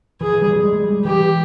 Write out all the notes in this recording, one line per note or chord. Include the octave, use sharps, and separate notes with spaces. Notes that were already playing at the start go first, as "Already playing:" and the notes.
E3 G#4
E3
G3
G3
G#3
G3
E3 G4